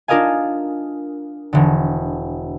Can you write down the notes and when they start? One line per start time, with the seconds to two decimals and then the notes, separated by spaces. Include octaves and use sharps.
0.08 D4 F4 A#4 D#5 F5 G#5
1.53 E1 D3